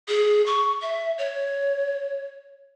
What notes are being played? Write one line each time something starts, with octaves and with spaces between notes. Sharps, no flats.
G#4
C#6
E5
C#5